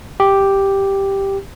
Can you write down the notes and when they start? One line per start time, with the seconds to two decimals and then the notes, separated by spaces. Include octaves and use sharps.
0.20 G4